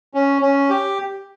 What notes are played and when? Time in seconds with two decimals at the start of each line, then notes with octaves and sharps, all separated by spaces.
0.14 C#4
0.42 C#4
0.70 G4